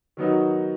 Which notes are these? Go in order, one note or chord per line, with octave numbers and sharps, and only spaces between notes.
D#3 F#3 B3 D#4 F#4